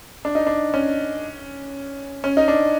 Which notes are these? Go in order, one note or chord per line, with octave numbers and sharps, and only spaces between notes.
D4
D#4
D4
C#4
C#4
D#4
D4